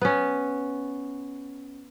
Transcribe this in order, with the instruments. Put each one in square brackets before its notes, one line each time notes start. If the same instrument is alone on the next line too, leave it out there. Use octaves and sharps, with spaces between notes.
[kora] B3 C#4